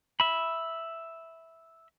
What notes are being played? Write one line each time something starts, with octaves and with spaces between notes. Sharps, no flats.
E5 B5